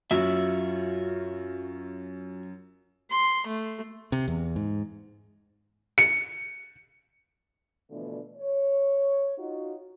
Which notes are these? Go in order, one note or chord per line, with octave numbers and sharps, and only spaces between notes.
F#2 F4 F#4 E5
C6
A3
C3
E2
G#2
C#7
B2 D3 E3 F3 A3 D4
C#5
D#4 F4 F#4